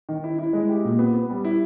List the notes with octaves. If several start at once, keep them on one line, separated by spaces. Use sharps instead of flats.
D#3
E4
E4
G#3
G4
A#2
B3
B3
G3
E4